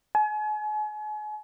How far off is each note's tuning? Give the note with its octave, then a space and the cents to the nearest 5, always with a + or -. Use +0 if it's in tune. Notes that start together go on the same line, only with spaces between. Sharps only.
G#5 +40